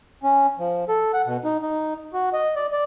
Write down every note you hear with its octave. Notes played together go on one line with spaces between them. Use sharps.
C#4
F3
A4
F#5
B2
D#4
D#4
F#4
D#5
D5
D5